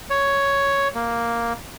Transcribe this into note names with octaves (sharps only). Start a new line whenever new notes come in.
C#5
A#3